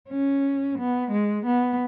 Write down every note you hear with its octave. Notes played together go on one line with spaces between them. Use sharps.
C#4
B3
G#3
B3